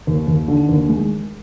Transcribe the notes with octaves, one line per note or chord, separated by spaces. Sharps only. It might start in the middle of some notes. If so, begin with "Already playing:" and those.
D#2
D#2
D3
D#2
G#3